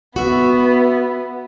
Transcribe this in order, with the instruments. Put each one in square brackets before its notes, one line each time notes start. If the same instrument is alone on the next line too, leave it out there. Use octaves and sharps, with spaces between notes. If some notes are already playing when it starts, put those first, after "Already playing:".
[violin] B3 [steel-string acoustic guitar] F#4 E5